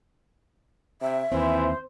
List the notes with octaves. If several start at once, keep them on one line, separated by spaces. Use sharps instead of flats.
C3 E5
D#2 E3 C4 C5